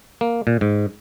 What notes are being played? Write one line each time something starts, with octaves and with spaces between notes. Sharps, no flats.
A#3
A#2
G#2